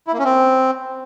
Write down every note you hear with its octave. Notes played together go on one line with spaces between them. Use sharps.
E4
A#3
C#4
C4